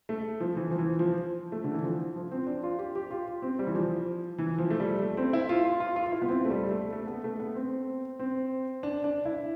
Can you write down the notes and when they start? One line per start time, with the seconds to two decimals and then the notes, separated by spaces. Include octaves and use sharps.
0.09 A3
0.40 F3
0.56 E3
0.71 F3
0.78 E3
0.99 F3
1.52 A3
1.64 D3
1.74 E3
1.84 F3
2.16 F3
2.31 C4
2.47 D4
2.63 F4
2.79 G4
2.96 G4
3.11 F4
3.42 C4
3.59 G3
3.67 E3
3.75 F3
4.38 E3
4.58 F3
4.70 A3
4.80 G3
5.02 A3
5.17 C4
5.33 E4
5.49 F4
5.65 F4
5.80 F4
5.96 F4
6.06 F4
6.12 E4
6.22 B3
6.28 C4
6.45 A3
6.50 G3
6.71 A3
6.93 A3
7.07 B3
7.24 A3
7.40 B3
7.55 C4
8.19 C4
8.83 D4
9.04 D4
9.25 E4